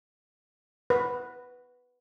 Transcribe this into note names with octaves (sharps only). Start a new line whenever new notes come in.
B4